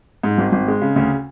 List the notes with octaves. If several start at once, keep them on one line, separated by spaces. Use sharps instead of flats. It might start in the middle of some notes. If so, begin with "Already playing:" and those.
G#2
G#1
G#1
G#3
C#3
D2